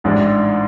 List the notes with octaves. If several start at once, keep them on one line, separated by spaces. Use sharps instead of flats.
A1 G#2 E3 G#3 D4